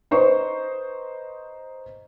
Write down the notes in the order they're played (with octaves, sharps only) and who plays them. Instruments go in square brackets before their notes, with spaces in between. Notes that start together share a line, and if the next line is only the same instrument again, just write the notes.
[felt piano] D#4 B4 C5 D#5 C#6